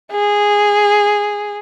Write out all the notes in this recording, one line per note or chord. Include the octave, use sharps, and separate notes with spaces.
G#4